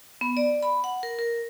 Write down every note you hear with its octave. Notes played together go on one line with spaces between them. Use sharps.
B3
D5
B5
F#5
A#4
A#4